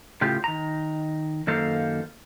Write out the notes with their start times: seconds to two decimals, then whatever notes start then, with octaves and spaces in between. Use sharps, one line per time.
0.21 A2 C#3 F4 G4
0.44 D#3 A#5
1.47 F#2 D#3 A#3 A4 C5 F5